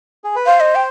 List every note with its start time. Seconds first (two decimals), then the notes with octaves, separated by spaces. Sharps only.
0.24 G#4
0.36 B4
0.46 C5 F5
0.60 D#5
0.75 G5